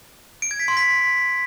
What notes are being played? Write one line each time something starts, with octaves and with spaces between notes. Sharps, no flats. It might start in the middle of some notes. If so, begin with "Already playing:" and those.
D7
G#6
B6
C6
B6